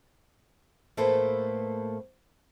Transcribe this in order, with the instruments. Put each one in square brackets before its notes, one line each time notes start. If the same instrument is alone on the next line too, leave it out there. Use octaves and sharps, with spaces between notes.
[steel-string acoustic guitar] A2 A3 A#3 A4 B4 C5